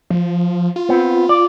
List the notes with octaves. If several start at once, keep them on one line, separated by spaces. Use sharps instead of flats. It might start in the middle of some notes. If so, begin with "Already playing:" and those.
F3
F4
B3 C4
D5